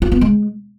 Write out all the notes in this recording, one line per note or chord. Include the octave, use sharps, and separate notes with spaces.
F4
B3
G#3